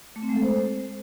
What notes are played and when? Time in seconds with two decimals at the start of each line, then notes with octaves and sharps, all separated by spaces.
0.16 A3
0.22 C4
0.29 G#3
0.36 A4
0.42 C5